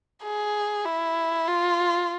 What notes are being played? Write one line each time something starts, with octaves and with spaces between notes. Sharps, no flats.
G#4
E4
F4